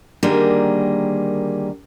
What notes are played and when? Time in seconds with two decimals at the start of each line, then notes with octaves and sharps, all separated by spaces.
0.23 D3 D#3 G3 A#3 G#4